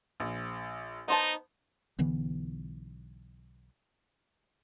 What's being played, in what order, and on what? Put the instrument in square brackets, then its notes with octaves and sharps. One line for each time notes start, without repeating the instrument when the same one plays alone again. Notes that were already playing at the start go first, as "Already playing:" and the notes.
[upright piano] A#1
[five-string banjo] B3 C5 A5 [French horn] D#4
[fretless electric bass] B1 D3 E3 B3